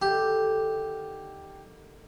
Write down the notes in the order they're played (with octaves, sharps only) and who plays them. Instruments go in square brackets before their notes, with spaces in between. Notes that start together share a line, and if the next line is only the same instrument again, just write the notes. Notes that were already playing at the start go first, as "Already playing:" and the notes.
[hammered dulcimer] D3 D#3 [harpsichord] G4